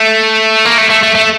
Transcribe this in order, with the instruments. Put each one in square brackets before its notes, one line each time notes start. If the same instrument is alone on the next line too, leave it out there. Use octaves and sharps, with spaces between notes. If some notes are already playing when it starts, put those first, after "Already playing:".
Already playing: [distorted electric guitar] A3
A#3
A3
A3
A3
A3